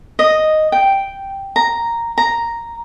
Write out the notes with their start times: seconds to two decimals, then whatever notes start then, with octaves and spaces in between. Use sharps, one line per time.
0.19 D#5
0.72 G5
1.56 A#5
2.18 A#5